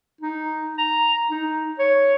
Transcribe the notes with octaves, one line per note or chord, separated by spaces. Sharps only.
D#4
A#5
D#4
C#5